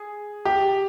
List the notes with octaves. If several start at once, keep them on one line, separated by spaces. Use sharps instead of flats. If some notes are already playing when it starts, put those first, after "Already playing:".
Already playing: G#4
G4